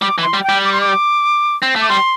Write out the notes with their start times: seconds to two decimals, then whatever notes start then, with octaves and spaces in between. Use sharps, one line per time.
0.02 G3 D6
0.18 E3
0.23 C6
0.34 G3
0.44 G5
0.49 G3
0.64 D6
0.73 C6
0.81 D6
1.62 C4
1.76 A3
1.82 D6
1.89 G3 C6